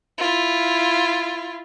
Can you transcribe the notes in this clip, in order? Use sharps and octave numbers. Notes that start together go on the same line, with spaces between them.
E4 F4